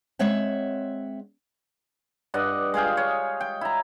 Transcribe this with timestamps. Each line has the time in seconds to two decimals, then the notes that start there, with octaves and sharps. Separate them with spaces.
0.19 G#3 C4 C#5 E5 F#5
2.34 G2 D5 D#5 F#5
2.74 G#3 G#4 F5 G5
2.97 C#5
3.41 G5
3.61 E4 A#5